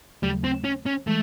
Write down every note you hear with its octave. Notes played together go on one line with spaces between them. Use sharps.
D#2 C#3 F#3 G3 A3
C4
C#4
C#4
E3 G#3 A3